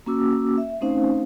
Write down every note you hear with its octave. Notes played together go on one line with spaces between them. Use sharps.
A#3 C#4 F#4 D6 E6
E5
A3 C4 C#4 D#4 C5 F5